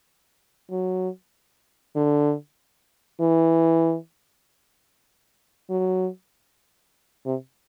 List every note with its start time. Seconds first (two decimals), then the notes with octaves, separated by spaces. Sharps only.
0.71 F#3
1.96 D3
3.20 E3
5.70 F#3
7.26 C3